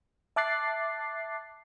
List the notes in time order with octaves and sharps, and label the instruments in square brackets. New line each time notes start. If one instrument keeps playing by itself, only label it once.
[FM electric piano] E5 A5 D6 F#6 A6 C7